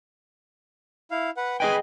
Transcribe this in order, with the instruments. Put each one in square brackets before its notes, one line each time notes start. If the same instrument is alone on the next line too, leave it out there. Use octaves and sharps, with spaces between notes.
[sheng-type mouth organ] E4 F5
B4 F#5
[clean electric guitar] G#4 D#5 G5 [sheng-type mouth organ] B4 G#5 B5